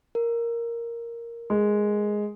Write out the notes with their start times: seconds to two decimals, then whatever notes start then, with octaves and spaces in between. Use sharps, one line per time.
0.15 A#4
1.50 G#3